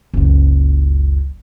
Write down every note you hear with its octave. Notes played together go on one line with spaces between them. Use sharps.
F#1 C#2